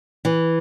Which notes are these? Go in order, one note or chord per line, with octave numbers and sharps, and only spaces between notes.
E3